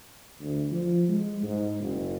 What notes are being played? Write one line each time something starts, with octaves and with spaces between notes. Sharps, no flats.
D2
F3
G#3
G#2
F#1